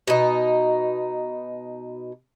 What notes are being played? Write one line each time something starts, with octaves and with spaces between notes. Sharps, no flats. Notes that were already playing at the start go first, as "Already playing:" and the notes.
B2 D#4